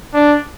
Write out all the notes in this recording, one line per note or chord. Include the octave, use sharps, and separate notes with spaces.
D4